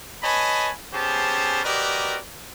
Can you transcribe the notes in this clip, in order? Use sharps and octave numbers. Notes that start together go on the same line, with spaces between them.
B4 C#5 D#5 G#5 A5 B5
B3 C#4 G4 G#4 C5 A5
F#4 G4 A#4 B4 D5 D#5